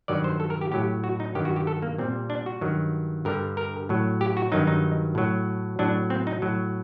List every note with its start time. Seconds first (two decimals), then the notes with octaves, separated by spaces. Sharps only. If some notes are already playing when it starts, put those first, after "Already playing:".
0.08 G2 D#3 F#3 D5
0.24 C5
0.40 A4
0.50 A#4
0.61 G4
0.72 A2 F#3 G4
1.04 F#4
1.20 D#4
1.35 G2 D#3 F#3 G4
1.45 F#4
1.56 G4
1.67 A4
1.82 A#3
1.98 A#2 G3 C4
2.30 D4
2.46 F#4
2.61 G2 D#3 F#3
3.25 G2 D3 G3 A#4
3.57 A#4
3.89 A2 F#3
4.21 G4
4.37 F#4
4.52 G2 D#3 F#3 D#4
4.67 D#4
5.15 A2 F#3
5.79 A2 F#3 D4
6.10 C4
6.27 D#4
6.42 A2 F#3